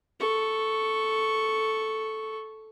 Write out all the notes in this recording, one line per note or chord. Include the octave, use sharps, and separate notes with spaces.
A4 C#6